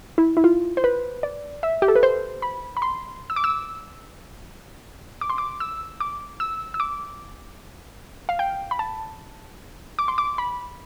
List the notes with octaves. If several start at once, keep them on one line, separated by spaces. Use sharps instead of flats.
E4
E4
F4
C5
B4
D5
E5
G4
A4
B4
C5
B5
B5
C6
E6
D6
E6
D6
C6
D6
E6
D6
E6
E6
D6
F5
G5
B5
A5
D6
C6
D6
B5